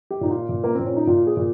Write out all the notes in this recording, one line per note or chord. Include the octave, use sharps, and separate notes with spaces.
G4
A#2 D#4
F4
A#2
A#3
A#2 C4
C#4
D#4
A#2 F4
G#4
A#2